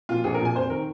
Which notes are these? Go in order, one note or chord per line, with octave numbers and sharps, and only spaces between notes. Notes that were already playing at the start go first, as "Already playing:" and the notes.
A#2 F3 F4
A#1 G#4
A#4
A#2 F3 G#5
F1 C5
D#3 A#4